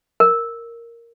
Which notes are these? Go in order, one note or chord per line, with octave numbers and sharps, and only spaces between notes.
A#4